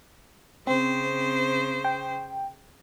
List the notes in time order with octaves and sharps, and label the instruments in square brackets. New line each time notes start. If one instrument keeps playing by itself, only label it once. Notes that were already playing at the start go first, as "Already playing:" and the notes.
[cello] C#3 C5 [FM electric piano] C4
[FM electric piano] G5